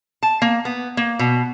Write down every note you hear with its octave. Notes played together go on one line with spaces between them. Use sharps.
A5
A#3
B3
A#3
B2